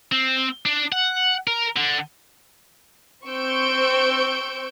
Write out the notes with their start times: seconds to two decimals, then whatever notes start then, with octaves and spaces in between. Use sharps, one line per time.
0.12 C4
0.65 D4
0.92 F#5
1.47 A#4
1.77 D3
3.26 C4 C5 C#6 E6 G6 D7